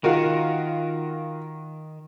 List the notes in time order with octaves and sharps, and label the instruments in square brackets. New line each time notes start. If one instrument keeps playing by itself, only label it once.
[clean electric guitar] D#3 [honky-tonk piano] F4 F#4 A#4